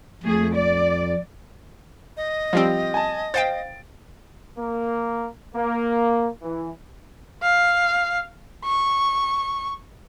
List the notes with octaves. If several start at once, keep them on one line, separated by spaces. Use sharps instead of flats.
F2 A3 G#4
D5
D#5
F3 G3 C4 F4 G4
G#5 A5
C5 F5 G5 A6 D7
A#3
A#3
E3
F5
C#6